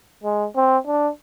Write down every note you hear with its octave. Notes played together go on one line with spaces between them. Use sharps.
G#3
C4
D4